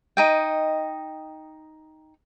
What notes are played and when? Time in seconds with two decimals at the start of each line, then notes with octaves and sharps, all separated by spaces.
0.17 D#4 D#5 G5